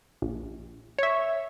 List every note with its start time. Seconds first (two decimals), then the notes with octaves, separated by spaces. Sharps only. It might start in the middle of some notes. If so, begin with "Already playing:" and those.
0.22 A#1
0.99 C#5 E5